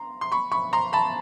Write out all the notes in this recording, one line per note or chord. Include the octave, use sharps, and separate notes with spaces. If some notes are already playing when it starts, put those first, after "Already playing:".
Already playing: A#5 C6
C6
B5 C#6
B5 C#6
A#5 C6
A5 B5